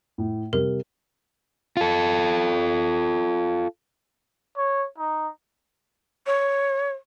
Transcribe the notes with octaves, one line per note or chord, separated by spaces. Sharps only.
A2
C3 G3 A#4
F4 A4
C#5
D#4
C#5